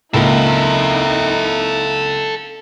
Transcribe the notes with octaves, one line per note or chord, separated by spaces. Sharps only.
C#2 A#3 D#4 E4 A4 D#5